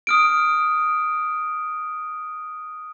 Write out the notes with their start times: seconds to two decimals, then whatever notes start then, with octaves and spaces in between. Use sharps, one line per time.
0.07 D#6 F6 D7